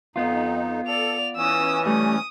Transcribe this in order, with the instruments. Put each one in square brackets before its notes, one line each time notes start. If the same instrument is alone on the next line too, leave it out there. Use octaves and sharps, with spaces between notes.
[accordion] F2 D#4 [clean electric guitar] B3 F4
[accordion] A4 [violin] D5 F7
[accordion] E3 C#4 [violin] D#6 E6
[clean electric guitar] G3 A3 [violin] D#6